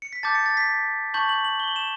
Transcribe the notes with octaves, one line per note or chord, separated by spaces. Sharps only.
C#7
B6
A5 D6 G6 A6
C#7
A6
B6
A5 C#6 G6 F#7
F#7
F#7
G7
F#7
E7